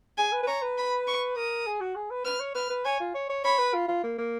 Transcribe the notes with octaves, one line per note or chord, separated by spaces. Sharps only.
G#4 G#5
B4
B4
C#5 A#5
B4
B5
C#6
A#4 D#6
G#4
F#4
G#4
B4
B4 F6
C#5
B4 F6
B4
C#5 G#5
F4
C#5
C#5
C#5 B5
B4
F4
F4
A#3
A#3